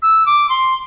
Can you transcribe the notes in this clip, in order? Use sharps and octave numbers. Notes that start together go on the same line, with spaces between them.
E6
D6
C6